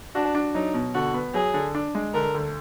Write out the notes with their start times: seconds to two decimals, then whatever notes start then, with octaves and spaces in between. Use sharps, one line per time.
0.15 D4 F#4
0.35 D4
0.55 F#3 D#4
0.74 B2
0.95 D3 F#4
1.14 B3
1.34 F#3 G#4
1.54 D3
1.75 D4
1.95 G#3
2.14 D3 A#4
2.34 D2